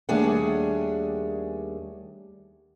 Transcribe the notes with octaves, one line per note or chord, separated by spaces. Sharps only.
D#2 G3 A3 D4 G#4 F#5